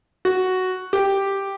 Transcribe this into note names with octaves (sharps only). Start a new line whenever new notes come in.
F#4
G4